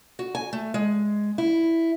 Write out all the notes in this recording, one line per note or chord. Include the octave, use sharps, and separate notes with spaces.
F#4
G#5
A3
G#3
E4